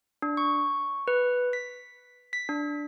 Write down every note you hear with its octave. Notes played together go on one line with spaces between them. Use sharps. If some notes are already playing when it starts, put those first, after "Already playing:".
D4
C#6
B4
B6
B6
D4